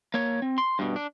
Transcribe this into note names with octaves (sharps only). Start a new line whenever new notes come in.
A#3 C#5
C4
C6
G2 B2
D4